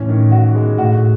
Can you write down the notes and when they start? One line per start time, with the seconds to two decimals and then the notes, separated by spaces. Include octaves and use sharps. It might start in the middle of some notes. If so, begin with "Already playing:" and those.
Already playing: A2 E3 C#4
0.09 D#3
0.31 F#4
0.55 G#3
0.78 A2 F#4